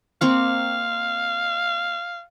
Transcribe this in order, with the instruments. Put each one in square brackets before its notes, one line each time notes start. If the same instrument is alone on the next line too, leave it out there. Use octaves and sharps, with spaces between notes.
[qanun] A#3 C4 C#6 [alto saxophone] F5